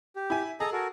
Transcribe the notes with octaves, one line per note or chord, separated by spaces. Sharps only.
G4
E4 G#5
G#4 A4 D#5 A#5
F#4 A4 A#4